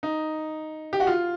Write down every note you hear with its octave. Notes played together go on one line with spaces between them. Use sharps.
D#4
G4
F#4
F4